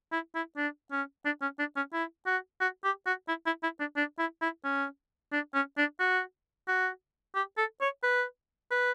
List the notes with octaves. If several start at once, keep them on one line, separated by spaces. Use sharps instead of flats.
E4
E4
D4
C#4
D4
C#4
D4
C#4
E4
F#4
F#4
G4
F#4
E4
E4
E4
D4
D4
E4
E4
C#4
D4
C#4
D4
F#4
F#4
G4
A4
C#5
B4
B4